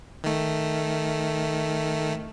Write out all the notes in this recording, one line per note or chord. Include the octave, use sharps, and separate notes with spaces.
D#3 A3